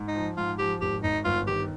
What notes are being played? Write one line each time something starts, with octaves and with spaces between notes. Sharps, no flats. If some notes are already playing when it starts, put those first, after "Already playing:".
Already playing: G#2
D#4
F3
G#2 F4
F3 G4
G#1 G4
G#1 D#4
G1 F4
D#3 G4